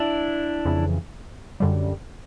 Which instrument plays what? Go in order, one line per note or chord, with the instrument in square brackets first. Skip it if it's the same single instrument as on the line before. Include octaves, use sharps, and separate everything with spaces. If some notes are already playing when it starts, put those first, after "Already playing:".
Already playing: [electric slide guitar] D4 E4
[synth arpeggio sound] F2 C#3 E3
F#2 D3 G3